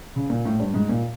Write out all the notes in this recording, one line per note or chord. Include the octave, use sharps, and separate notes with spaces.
C#3
A#2
A2
G2
G#2
A#2